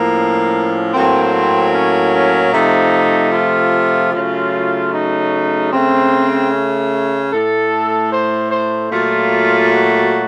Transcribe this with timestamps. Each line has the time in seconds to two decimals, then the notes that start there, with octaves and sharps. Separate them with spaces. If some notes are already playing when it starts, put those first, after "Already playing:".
Already playing: A2 F3 A#3
0.14 C#4
0.93 A2 F#3 A#3 C4
1.74 C#4
2.13 C#4
2.52 C3 F3 A3 D#4
3.32 F4
4.12 C#3 F#3 A3 F4
4.92 D#4
5.72 C#3 A3 C4
6.51 C#4
7.32 A2 A3 A4
8.11 C5
8.51 C5
8.91 A#2 F#3 A3 F4
9.72 F#4